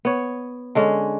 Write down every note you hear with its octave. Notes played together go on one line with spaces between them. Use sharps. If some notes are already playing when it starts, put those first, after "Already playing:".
B3 C#5
D3 G#3 C#4